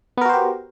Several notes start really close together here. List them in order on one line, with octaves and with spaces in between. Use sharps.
B3 A#4 F#4 C5 G4